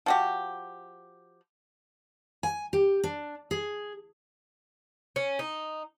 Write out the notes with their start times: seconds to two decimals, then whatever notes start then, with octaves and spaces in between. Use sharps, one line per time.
0.06 F3 F#4 G4
2.43 G#5
2.73 G4
3.04 D4
3.51 G#4
5.16 C#4
5.39 D#4